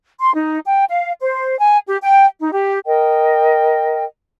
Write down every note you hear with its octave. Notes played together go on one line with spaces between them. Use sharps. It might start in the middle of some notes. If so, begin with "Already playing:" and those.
C6
D#4
G5
F5
C5
G#5
G4
G5
D#4
G4
A#4 D#5 G5